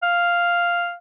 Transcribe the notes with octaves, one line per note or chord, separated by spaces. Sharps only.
F5